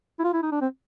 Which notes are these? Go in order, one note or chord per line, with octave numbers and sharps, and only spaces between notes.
E4
F4
E4
D#4
D4
C4